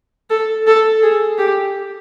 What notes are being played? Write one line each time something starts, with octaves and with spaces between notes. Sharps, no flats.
A4
A4
G#4
G4